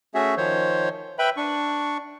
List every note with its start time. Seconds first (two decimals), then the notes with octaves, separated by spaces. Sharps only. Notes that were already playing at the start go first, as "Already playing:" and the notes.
0.14 A3 C#4 F#4 G#4 E5
0.37 D#3 F3 C5 C#5
1.19 B4 E5 G5 B5
1.37 D4 C#6